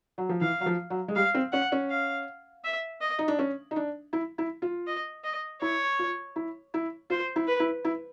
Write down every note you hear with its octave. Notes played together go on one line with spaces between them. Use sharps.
F#3
F3
E3 F5
F#3
F3
F#3
G#3
G3 F5
C4
C#4 F#5
C#4
F5
E5
D#5
D#4
D4
C#4
D#4
D4
E4
E4
F4
D#5
D#5
E4 C#5
F4
E4
E4
F4 C5
E4
B4
E4
E4